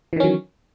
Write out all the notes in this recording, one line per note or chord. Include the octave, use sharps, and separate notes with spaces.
D#3 E3 F#3 C#4